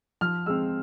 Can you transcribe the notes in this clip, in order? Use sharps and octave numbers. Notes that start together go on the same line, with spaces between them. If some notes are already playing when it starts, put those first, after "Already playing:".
F3 F6
G#3 C4 E6